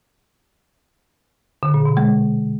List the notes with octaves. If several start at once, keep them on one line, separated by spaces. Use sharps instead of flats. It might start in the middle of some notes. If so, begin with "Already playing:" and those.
D3
A#2
B2
G#3